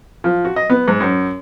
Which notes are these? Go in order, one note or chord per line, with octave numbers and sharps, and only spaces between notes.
F3
F#4
D#5
B3
G#2
F#2